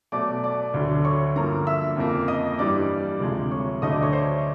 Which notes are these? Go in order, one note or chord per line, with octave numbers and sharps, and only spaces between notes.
B2 F#3 A3 D5 D6
D5 D6
D2 D3 F#3
C#5 C#6
G2 D3 F3 A#3 A#4 A#5
E5 E6
F2 C#3 F3 A#3
D#5 D#6
G2 E3 G3 D5 D6
D2 C3 F3 G#3
C#5 C#6
D2 D3 F#3 A3 D#5 D#6
D5 D6
C#5 C#6
C5 C6